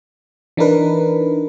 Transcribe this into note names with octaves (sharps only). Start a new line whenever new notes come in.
E3 D4 D#4 A#4 B4